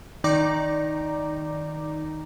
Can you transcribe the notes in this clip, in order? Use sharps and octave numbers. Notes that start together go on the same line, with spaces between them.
D#3 D#4 D5 A#5 D6